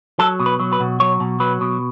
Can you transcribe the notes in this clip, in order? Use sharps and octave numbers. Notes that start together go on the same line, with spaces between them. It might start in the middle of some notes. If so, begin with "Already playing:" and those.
F#3 A4
B2
B4
F#3
B4
B2
F#3 C#5
B2
F#3 B4
B2